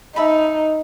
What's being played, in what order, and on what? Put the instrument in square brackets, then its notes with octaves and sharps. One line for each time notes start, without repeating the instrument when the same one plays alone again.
[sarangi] D#4 [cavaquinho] E5 A5 B5